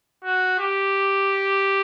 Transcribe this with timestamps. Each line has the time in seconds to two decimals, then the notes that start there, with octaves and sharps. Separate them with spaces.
0.24 F#4
0.59 G4